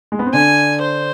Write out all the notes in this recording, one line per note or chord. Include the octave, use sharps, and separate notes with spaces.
G#3
B3
C4
D3 D4 G#5
C5